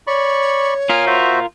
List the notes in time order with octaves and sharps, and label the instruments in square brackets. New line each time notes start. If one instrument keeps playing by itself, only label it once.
[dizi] C#5 [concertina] D5 B5 C#6
[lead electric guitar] F4 A#4 [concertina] G#5 D#6 F6
[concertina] F#4 C5 E5